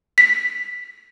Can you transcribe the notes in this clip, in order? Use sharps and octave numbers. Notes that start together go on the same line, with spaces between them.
B6